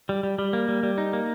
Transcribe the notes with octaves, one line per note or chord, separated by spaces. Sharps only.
G3
G3
G3
A#3
G3
G3
D#4
A#3